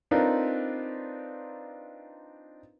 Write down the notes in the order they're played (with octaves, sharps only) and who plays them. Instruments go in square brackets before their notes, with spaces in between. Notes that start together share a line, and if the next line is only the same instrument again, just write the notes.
[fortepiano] C4 D4 D#4 F4 A#4 B4